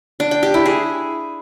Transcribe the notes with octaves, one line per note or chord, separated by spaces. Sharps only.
D4
G5
G4
E4
G#4